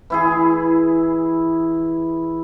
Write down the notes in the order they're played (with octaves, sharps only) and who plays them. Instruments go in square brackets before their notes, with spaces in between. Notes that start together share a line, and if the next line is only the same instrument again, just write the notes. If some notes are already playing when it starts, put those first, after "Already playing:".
[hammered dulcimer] E3 E4 G#4